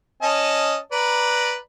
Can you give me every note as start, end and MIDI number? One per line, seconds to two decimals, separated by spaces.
0.22 0.77 61
0.22 0.77 75
0.22 0.77 81
0.92 1.56 71
0.92 1.56 74
0.92 1.56 82